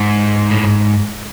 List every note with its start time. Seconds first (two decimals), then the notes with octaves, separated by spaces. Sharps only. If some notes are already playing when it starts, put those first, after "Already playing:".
Already playing: G#2
0.50 A2